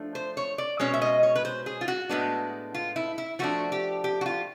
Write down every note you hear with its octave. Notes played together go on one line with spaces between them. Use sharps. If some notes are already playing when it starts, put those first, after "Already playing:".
Already playing: F3 A3 D4
C5
C#5
D5
B2 G#3 C#4 C#5
E5
D#5
C#5
B4
C5
G#4
F4
F#4
A2 E3 G#3 B3 D4
F4
E4
E4
F3 A3 D4 F#4
G4
G4
F#4
F4